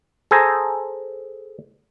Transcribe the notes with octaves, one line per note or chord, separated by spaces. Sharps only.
G#4 A4 C5 G#5 A#5